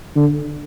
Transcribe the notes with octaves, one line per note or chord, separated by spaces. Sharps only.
D3